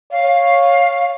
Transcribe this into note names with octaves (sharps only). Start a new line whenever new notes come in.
C#5 F5